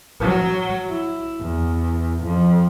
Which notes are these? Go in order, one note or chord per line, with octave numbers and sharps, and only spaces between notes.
F#3
E4
E2
F2